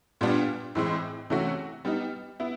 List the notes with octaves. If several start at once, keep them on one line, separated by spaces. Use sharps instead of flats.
A#2 G3 B3 D4
A2 E3 G#3 C4
C3 E3 A3 C#4 F#4
G3 B3 D#4
B3 E4